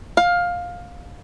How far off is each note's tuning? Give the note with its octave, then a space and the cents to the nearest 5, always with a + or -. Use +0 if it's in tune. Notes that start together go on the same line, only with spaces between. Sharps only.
F5 +15